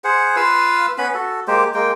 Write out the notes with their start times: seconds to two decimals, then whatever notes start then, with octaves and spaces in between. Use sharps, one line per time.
0.04 G#4 C5 F#5
0.36 F4 B4 F5 E6
0.98 B3 C#4 B4 B5
1.14 F#4 A4
1.48 G#3 A#3 G4 C5
1.74 G#3 A#3 G5